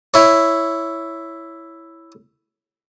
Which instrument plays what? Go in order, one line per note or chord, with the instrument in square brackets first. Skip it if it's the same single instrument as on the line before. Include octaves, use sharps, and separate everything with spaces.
[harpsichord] E4 C#5